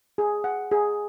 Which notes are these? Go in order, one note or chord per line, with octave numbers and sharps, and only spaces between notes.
G#4
F#5
G#4